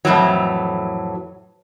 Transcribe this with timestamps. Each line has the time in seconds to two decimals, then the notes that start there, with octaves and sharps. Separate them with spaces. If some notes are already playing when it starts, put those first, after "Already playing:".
0.05 F2 A2 E3 F#3